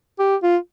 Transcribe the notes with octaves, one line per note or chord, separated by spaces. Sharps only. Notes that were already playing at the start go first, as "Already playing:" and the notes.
G4
F4